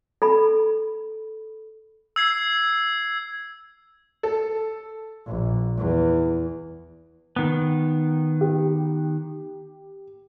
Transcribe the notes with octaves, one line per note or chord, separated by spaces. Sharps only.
A4 B5
E6 G#6 C7
A4
A#1
E2
D#3 B3
G4